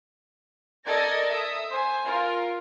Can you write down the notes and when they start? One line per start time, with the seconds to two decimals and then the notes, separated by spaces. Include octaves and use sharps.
0.87 A4 A#4 D5 D#5 G#6 A#6
1.30 E5 D#6
1.69 C5 G#5
2.06 F4 A#4